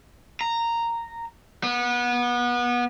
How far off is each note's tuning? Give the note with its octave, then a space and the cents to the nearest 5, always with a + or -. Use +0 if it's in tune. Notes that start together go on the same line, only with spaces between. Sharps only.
A#5 -10
B3 -25